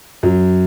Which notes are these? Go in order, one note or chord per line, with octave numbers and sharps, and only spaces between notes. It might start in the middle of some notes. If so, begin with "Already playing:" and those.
F#2 F#3